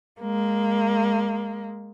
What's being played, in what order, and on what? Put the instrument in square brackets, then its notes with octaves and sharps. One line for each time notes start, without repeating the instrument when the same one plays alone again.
[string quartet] G#3 A#3